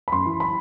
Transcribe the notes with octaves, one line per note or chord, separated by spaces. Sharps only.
B5
F#2 C6
E3
B5